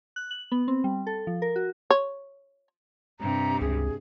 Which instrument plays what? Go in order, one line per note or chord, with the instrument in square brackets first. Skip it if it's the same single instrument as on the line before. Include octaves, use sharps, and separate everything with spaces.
[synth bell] F#6
F#7
B3
C4
G3
A4
F3
A#4
F#4
[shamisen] C#5
[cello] G2 C3 [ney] A#5
[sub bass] C#2 [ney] G#4